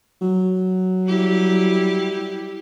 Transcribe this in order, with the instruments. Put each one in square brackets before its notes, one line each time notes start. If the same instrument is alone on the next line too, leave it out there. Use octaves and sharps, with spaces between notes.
[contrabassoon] F#3
[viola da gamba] G3 E4 G4